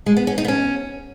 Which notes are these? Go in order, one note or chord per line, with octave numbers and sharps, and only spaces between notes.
G#3
B3
C#4
D#4
B3
C#4